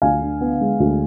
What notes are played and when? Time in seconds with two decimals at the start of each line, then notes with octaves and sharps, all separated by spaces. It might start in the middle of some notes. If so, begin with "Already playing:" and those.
0.02 D2 F5 G#5
0.22 D3
0.41 B3
0.61 G#3
0.80 D2